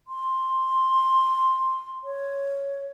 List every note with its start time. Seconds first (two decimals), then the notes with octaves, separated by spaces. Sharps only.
0.07 C6
2.04 C#5